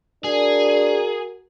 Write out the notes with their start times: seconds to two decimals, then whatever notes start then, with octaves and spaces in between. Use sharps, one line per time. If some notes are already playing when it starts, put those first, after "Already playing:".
0.24 D4 F#4 G#4 A#4